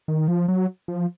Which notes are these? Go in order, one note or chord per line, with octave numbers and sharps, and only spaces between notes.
D#3
F3
F#3
F3